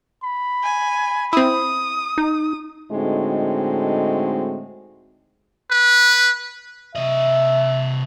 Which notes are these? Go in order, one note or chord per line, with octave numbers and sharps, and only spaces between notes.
B5
G#5
C4 E4 D#6
D#4
A2 D3 G#3 C4 D#4 F#4
B4
C3 D#5 E5